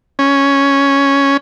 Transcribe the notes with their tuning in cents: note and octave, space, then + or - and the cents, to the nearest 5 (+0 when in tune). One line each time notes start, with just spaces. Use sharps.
C#4 +0